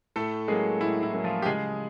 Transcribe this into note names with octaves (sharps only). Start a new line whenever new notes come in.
A2 A3 A4
F#3 G#3 A#3 C#4 G#4
A2 E4
E4
F#3 A#3 C#4
F3 F4
G4
C#3 G#3 G#4